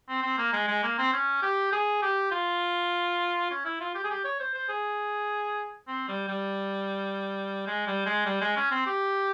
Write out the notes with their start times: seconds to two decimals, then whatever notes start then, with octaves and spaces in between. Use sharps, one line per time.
0.09 C4
0.23 C4
0.38 A#3
0.53 G#3
0.68 G#3
0.83 A#3
0.98 C4
1.13 C#4
1.42 G4
1.72 G#4
2.02 G4
2.32 F4
3.51 C#4
3.65 E4
3.80 F4
3.95 G4
4.04 G#4
4.10 G4
4.24 C#5
4.40 C5
4.54 C5
4.69 G#4
5.88 C4
6.08 G3
6.28 G3
7.67 G#3
7.87 G3
8.06 G#3
8.25 G3
8.41 G#3
8.56 C#4
8.71 C4
8.86 G4